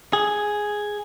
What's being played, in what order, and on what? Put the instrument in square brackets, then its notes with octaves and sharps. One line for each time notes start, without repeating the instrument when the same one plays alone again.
[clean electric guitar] G#4